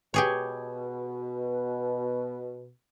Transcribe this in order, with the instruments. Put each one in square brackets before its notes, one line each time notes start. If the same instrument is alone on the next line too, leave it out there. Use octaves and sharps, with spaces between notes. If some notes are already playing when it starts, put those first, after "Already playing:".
[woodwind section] B2 [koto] G4 G#4 C#5